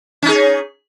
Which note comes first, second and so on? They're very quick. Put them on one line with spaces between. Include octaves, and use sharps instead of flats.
C#4 D#4 G#4